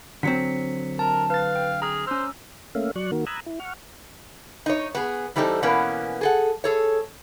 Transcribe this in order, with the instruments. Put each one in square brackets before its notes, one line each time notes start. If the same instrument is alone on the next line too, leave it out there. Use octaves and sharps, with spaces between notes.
[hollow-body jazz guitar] D3 F#3 C4 [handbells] B6 C#7
[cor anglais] A#4 [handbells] A5
[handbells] B4 A6 [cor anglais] F5
[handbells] G5
[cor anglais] G#4 [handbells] A#5 F6
[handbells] C#4 E6 [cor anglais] C5
[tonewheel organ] A3 A#3 C#4 E5 F5
F#3 D5 C#6 F#6
D#3 A#3 F#4 A#4
A#5 B5 D#6 E6 F#6 G#6
E4
F#5 C#6 F6
[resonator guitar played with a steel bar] D#4 C#5
B3 G#4
E3 G3 C4 D#4 A4
B2 E3 A#3 B3 C#4
G#4 A4 F#5
G#4 A4 C#5